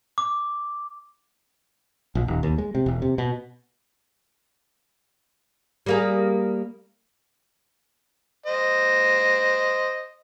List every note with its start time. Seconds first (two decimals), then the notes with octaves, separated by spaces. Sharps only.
0.18 D6
2.15 A#1
2.28 D#1
2.43 D#2
2.58 G#3
2.75 C3
2.86 E1
3.02 C3
3.18 B2
5.86 G3 A#3 G#4
8.46 C5 D#5